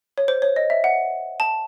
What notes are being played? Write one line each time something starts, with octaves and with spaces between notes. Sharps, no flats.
C#5
C5
C#5
D#5
E5
F#5
A5